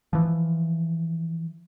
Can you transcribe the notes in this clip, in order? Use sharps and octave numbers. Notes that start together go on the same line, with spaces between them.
E3 F3